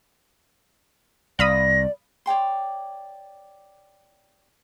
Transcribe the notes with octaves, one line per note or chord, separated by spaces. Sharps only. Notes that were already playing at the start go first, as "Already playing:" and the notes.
C2 D5 F5 B5 D#6 A#6
C#5 D5 G5 C6